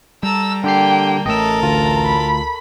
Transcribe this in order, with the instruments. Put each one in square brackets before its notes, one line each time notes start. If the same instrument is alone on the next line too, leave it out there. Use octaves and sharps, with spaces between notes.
[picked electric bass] G3 [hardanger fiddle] A4 A#5 [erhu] E6
[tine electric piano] D3 G4 C7 [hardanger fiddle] A#3 A4 [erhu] G5
[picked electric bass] A1 A3 [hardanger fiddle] A4 A#4 [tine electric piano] D#5 E6
[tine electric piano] D2 F4 [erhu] A#5
[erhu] B5